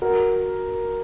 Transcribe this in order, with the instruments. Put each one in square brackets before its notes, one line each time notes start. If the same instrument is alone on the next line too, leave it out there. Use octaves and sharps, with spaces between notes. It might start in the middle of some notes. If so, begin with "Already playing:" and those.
[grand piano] F#4 A#4